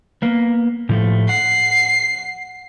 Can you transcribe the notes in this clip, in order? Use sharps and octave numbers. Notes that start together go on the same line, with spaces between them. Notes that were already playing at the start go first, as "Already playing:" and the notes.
A#3 B3
A2 F3 A3
F#5 C7